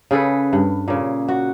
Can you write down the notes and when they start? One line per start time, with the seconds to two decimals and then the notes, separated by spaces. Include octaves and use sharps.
0.11 C#3 G#4 A4 B4
0.53 G2
0.88 A#2 C#3
1.28 F#4